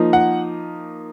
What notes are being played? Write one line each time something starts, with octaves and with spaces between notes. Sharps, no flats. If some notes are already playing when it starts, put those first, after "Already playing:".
Already playing: F3 A#3 D#4
F#5